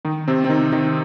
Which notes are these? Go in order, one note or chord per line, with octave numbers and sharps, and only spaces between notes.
D#3 D#4
C3 C4
C4
D#3 D#4
D#3 D#4